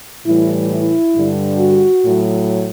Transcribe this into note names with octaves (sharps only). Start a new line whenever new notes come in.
A2 E3 G3 E4
E4
G2 D3 G3
F#4
A2 F#3